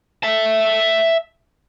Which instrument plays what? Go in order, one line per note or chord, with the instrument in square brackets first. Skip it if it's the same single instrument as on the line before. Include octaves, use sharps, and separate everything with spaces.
[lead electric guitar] E5 A5